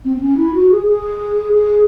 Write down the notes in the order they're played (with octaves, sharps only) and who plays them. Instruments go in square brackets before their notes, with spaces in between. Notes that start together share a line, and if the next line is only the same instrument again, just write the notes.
[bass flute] C4
C4
C#4
E4
F#4
G#4
G#4
G#4